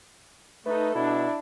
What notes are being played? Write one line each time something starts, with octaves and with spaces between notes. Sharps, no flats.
A3 D#4 A4 B4
B2 D4 E4